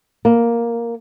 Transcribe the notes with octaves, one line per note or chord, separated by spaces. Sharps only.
A#3